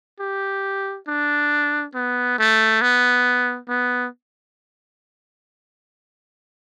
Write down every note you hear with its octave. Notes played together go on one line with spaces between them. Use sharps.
G4
D4
B3
A3
B3
B3